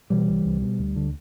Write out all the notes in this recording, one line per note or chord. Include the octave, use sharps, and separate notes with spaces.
B2 E3 G3
C2
C2
B2
D2
D3